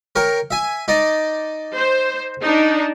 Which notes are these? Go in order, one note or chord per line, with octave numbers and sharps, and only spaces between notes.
A#4 C#5 G5
E5 G#5
D#4 D5 D#5
C5
D4 D#4